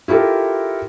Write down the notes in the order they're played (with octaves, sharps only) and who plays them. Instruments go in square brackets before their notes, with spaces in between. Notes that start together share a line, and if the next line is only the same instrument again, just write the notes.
[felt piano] E4 F4 G4 A4 A#4